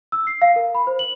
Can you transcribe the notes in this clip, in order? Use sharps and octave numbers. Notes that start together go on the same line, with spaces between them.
E6
C7
F5
A#4
B5
C5
F#7